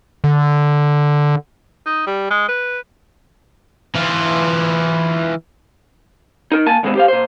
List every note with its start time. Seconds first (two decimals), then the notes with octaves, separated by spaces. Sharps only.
0.24 D3
1.86 D#4
2.07 G3
2.31 G#3
2.49 B4
3.95 E3 F4
6.52 D#4 A#4
6.66 A#3 G#5 A5
6.83 D#2 B2 G#3 C4
6.95 G4 C5 F5
7.08 A#2 C5